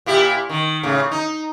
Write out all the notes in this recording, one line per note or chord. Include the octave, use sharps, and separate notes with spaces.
A#2 E4 G4
D#3
A2 C#3
D#4